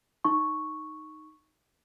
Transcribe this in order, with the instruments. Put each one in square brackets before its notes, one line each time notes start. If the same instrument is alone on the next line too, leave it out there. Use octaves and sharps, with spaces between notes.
[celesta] D#4 C#6